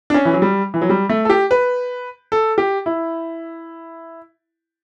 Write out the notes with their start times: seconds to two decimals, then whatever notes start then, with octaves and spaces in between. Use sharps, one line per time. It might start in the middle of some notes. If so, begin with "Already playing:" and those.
0.10 D4
0.14 C#4
0.25 E3
0.34 F#3
0.42 G3
0.74 E3
0.81 F#3
0.90 G3
1.10 A3
1.25 A4
1.30 G4
1.51 B4
2.32 A4
2.58 G4
2.86 E4